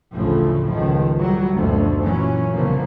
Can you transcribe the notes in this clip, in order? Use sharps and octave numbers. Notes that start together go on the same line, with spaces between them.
A1 D2 A2 C#3 F3
C#2 D#3 F3
A2 F#3 G3
F#1 D2 B2 F3
A#2 E3 F#3 C#4
C2 C#3 F3 A#3 B3